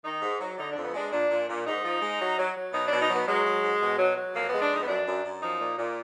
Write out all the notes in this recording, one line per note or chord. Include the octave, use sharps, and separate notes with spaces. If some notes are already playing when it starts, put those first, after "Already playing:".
D#3 D#4
G#2
F#3
D3 D#4
D4
F2
B3
G#3 D4
A#2 D4
A#2
A#2
G#2 D#4
F3
G#3
F#3
F#3
F#3
B2 D#4
D4
B2
D#4
F#3 B3
F#3 G#3
F#3
G#2
B2
F#3
F#3
F2 A#3
G#3 B3
D4
F2 D#4
B3
F#2 D4
F#2
F#2
F3 D#4
A#2
A#2